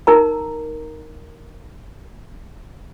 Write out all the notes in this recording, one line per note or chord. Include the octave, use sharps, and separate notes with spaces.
D#4 A#4 A#5